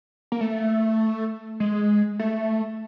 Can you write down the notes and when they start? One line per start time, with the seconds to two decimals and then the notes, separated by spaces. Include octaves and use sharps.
0.32 A#3
0.41 A3
1.60 G#3
2.20 A3